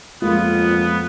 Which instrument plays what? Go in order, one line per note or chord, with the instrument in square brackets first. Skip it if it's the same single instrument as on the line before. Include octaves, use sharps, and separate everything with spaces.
[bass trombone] F2 [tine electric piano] G#3 [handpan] A#3 F4 [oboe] B3